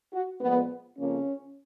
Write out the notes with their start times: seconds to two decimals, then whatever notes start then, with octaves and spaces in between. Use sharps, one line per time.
0.13 F#4
0.41 A#2 F3 G#3 B3
0.98 F2 C#3 F3 A#3 C#4